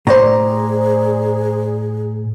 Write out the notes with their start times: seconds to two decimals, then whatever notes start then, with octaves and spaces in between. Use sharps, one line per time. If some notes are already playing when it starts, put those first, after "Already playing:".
0.07 A2 G#4 C5 D5 A#5